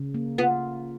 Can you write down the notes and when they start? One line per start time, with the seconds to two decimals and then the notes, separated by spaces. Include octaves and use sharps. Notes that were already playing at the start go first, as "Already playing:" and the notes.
Already playing: C#3
0.14 A#3
0.38 B3 F4